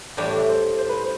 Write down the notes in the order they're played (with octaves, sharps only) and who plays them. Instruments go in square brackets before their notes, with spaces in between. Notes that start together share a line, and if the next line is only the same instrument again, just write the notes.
[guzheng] A2 E3 G3 D4 [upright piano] D5
[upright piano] D5
E5
C5
C5
B4
C5